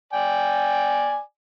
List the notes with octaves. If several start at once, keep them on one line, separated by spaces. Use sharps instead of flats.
D5 G5 G#5